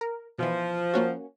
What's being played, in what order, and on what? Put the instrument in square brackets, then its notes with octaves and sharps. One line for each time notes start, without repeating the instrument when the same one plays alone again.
[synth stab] A#4
[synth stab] B2 E3 [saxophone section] F3
[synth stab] A#3 C#4 F#4